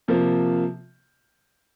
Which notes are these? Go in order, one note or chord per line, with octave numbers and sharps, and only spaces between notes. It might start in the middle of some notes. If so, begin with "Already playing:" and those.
C3 F3 A#3 F4